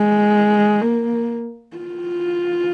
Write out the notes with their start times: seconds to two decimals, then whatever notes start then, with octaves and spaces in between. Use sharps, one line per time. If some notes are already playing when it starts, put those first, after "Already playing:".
Already playing: G#3
0.81 A#3
1.77 F4